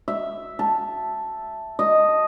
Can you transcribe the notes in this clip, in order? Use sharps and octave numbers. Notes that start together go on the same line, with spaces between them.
E5
A5
D#5